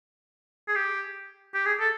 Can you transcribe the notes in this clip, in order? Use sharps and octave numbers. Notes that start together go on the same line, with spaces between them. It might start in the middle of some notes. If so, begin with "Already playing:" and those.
G#4
G4
G4
G#4
A4